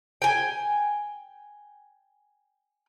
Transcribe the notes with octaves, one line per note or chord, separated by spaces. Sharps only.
G5 G#5